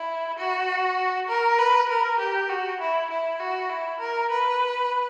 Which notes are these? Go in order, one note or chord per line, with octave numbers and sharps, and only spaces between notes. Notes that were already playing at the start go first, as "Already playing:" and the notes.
Already playing: E4
F#4
A#4
B4
A#4
G4
F#4
E4
E4
F#4
E4
A#4
B4